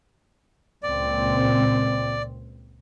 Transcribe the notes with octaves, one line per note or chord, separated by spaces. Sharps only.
C#2 A#2 C4 D5